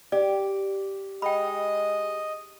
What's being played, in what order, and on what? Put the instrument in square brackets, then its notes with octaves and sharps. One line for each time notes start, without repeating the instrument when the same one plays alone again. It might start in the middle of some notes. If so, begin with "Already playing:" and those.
[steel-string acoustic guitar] G4 [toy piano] D5
[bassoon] G#3 [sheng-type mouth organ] D#5 [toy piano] G5 B5